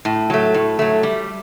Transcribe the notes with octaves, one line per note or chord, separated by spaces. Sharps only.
A2
F#3 A3
A2
F#3 A3
G3